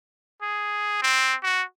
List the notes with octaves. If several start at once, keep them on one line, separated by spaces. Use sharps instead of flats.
G#4
C4
F#4